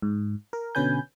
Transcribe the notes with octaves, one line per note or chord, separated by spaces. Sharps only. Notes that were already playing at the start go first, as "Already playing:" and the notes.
G#2
A#4
B2 D3 C#4 B4 G#5 G6